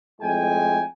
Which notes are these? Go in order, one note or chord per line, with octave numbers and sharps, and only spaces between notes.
F2 A2 G#3 G5 G#5